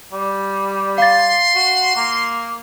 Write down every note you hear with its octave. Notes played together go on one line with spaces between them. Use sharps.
G3
F5 C6 A6
F#4
A#3